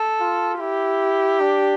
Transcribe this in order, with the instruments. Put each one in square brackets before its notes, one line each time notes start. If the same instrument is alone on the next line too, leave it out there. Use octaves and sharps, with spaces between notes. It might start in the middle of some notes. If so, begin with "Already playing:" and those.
Already playing: [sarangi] A4
[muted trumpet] F4
[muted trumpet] E4 [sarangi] G4
[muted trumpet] D4